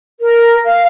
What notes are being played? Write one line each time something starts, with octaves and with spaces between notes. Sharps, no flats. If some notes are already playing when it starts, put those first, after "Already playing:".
A#4
F5